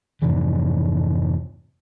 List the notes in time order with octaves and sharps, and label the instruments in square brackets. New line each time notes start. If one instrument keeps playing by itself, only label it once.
[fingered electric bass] F2 G#2 C3 E3